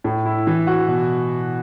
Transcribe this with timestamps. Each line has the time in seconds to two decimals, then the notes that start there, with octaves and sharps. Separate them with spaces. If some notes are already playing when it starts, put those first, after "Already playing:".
0.04 A2
0.26 E4
0.47 E3
0.67 F#4
0.88 B2